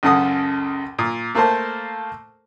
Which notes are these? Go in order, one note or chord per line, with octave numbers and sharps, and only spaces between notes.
C#2 F#2 C#3 A4 F#5 D#6
A#2
A3 A#3 A4 A#4 C5 A5